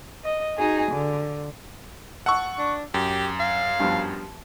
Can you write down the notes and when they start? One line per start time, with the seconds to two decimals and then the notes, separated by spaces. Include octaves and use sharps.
0.24 D#5
0.58 D#4 F#4 G#4 G#5
0.92 D3
2.26 F#5 A5 C#6 E6
2.58 D4
2.94 F#2 G4
3.40 F5
3.80 G2 F3 B3